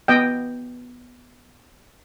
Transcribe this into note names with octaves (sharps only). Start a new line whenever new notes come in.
B3 D#5 G5